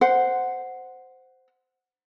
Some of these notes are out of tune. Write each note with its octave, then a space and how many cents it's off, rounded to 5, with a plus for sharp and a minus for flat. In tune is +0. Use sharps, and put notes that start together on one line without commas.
C5 -10 F#5 +0